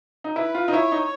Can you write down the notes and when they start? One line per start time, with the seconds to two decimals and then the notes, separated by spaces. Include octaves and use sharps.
0.24 D#4
0.36 E4 B4
0.55 F4
0.68 D#4
0.72 E4 C#5
0.92 D#4